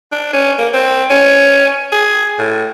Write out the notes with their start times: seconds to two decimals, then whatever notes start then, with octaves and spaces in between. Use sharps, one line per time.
0.12 D4
0.33 C#4
0.58 A#3
0.74 C4
1.10 C#4
1.92 G#4
2.39 A2